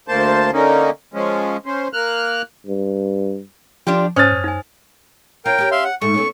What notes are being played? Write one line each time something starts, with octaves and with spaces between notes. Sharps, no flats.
D2 A#3 C5 A5
D3 A#3 C#4 D#4
F3 G#3 C#4
C#4 C5
A#3 F6 F#6
G2
F3 D4 F4 G4
G#2 C#4 C5 C#5 A5 D#6 F6 A6
F#2
D#4 G#5
C#4 F4 A#4 G5
C#4 G4
E5 F5 C6
F#5
G#2 A3 C#6
A3 B3 C#4